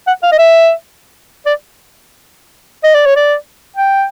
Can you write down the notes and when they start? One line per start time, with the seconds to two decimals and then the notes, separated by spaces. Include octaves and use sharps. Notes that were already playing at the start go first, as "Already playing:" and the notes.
0.07 F#5
0.23 F5
0.32 D#5
0.38 E5
1.46 D5
2.84 D#5
2.95 D5
3.06 C#5
3.16 D5
3.77 G5